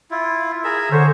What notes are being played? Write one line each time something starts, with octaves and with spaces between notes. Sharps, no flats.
E4 F4
G#4 A#4 E5
D3 C5 C#5